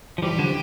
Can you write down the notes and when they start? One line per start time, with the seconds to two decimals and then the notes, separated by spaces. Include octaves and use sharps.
0.18 F3
0.22 E3 G3 G4
0.39 D3 F3